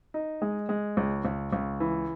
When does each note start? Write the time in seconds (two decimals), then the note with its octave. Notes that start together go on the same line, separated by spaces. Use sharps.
0.14 D#4
0.42 G#3
0.69 G#3
0.97 C#2
1.25 C#2
1.53 C#2
1.80 E3